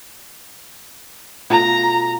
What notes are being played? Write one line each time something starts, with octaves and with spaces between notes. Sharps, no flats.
B2 A3 F4 A#5